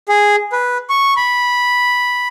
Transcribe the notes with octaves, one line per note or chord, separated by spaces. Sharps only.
G#4
B4
C#6
B5